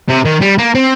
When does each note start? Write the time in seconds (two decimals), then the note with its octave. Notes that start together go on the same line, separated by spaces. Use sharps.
0.09 C3
0.25 D#3
0.42 G3
0.58 A#3
0.75 C4